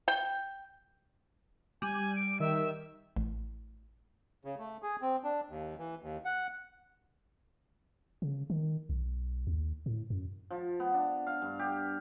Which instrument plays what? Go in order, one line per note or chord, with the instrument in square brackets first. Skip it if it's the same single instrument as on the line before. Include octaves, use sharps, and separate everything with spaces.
[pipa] G5
[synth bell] G3 [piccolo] G#5
[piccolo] D7
[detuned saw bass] D#3 [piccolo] E5
[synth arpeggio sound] A1
[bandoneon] C#3
A3
G#4
C4
D4
D#2
E3
D#2
F#5
[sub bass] C#3
D#3
B1
D#2
A2
F#2
[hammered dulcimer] F3
B3
D4
F5
G2
G4